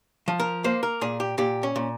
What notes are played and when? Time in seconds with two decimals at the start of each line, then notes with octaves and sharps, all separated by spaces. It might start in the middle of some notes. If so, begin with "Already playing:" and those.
0.28 F3
0.40 A#4
0.64 A#3 C5
0.83 A#4
1.01 A#2 G#4
1.20 G4
1.38 A#2 G4
1.63 C#4
1.76 A#2